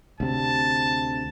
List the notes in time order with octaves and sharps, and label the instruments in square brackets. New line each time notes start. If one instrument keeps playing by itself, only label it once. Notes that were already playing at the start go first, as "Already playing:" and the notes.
[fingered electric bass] D2 C3 [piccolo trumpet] A5